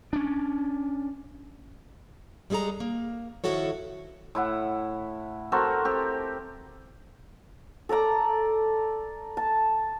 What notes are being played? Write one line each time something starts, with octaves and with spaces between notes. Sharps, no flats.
C#4 D4
G3 G#3 G#4 A4 A#5
A#3
D#3 F3 E4 F#4 A4 C#5
A2 E4 F#5
C4 F#4 A4 A#4
C4 G4
A4 A#4 D5 A#5
A5